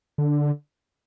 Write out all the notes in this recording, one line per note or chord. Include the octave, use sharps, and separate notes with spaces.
D3